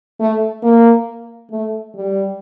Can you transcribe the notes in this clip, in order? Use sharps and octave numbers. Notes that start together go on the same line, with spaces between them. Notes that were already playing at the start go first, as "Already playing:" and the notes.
A3
A#3
A3
G3